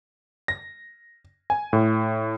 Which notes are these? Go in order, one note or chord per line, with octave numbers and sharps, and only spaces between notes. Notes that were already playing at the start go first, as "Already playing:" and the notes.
A#6
G#5
A2